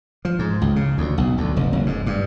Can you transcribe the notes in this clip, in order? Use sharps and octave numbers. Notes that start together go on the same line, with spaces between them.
F3
G#2
C#2
C#3
D2
B1
D2
F1
F#1
G#2
G2